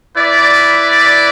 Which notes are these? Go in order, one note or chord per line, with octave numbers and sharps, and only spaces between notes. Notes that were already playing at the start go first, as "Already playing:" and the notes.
E4 B4 D5